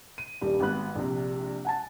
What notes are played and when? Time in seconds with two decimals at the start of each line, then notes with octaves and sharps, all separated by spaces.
0.18 D#7
0.41 D#1 G2 G3
0.60 G#1 B3 B5 F#6
0.95 A#1 C3
1.65 F#5 G#5 A5